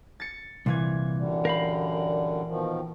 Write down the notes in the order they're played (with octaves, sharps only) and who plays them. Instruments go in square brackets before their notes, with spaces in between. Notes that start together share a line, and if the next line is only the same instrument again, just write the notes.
[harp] A6 C#7
[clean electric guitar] C2 [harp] A#2 E3 G#6
[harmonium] F#2 D3 G3
[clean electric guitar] A#4 F5 B5 [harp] G6
[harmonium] B2 D#3 F3